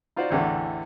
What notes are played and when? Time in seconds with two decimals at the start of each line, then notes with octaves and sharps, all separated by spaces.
0.16 D#4 F4 F#4 C5 D5
0.30 A1 E2 D3 E3